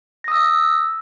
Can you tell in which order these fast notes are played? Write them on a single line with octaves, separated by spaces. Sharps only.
A#6 D#6 E6